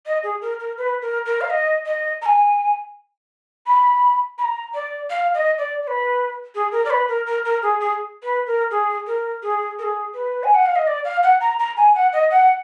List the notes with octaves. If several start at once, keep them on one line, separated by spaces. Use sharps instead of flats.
D#5
G#4
A#4
A#4
B4
A#4
A#4
F5
D#5
D#5
A#5
G#5
B5
B5
A#5
D5
F5
D#5
D5
D5
B4
G#4
A#4
D5
B4
A#4
A#4
A#4
G#4
G#4
B4
A#4
G#4
A#4
G#4
A#4
G#4
B4
G#5
F#5
F5
D#5
D5
F5
F#5
A#5
A#5
G#5
F#5
D#5
F#5